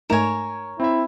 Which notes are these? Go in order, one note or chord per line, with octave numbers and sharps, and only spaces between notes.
G#2 A3 D#4 A#4 C#5 G#5 C#6 E7
C4 E4 E5